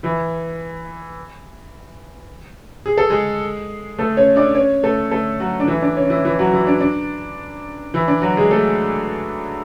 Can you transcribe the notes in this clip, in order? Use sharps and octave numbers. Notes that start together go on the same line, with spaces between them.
E3 E4
G#4
A4
G#3 G#4
A3 A4
C#4 C#5
D4 D5
C#4 C#5
A3 A4
A3 A4
F#3 F#4
D4
E3 E4
D4
C#4
E3 E4
E3 E4
F#3 F#4
E3 E4
D4
D4
E3 E4
D4
F#3 F#4
G#3 G#4
A3 A4